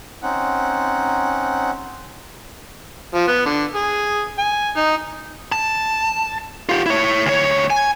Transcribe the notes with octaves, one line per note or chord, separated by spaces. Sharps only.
C4 C#4 D#4 F#5
F3
B3
D3
G#4
G#5
D#4
A5
F4 G4
E4 C#5
D2 C#5
G#5